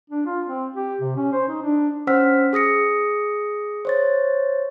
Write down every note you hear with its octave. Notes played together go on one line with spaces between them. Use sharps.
D4
F4
C4
G4
C3
C#4
C5
D#4
D4
C#4 C5 F#5 E6 F6 B6
G#4 D#6 A#6 C#7
C5 C#5 A6